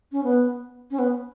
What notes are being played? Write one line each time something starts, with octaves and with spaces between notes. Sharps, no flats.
C#4
B3
C#4
B3